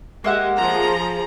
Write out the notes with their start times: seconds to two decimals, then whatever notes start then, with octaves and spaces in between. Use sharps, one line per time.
0.24 G#3 A#3 G4 E5 F#5
0.58 F3 G#4 A#5